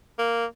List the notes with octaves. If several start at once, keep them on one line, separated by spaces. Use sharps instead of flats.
A#3